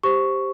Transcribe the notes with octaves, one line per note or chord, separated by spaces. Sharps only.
G4 C5 C#6